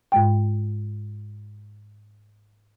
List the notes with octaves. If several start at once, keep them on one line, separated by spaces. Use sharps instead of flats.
G#2 G#3 G5